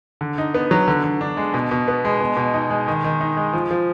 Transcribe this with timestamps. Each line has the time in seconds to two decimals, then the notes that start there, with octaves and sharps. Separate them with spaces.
0.21 D3
0.38 D#4
0.54 B3
0.71 F#3
0.88 D3
1.04 D3
1.21 D4
1.37 G#3
1.54 B2
1.71 B2
1.88 B3
2.05 G#3
2.21 B2
2.37 B2
2.54 D#4
2.70 G#3
2.88 D#3
3.04 D#3
3.21 D#4
3.37 G#3
3.53 F3
3.71 F3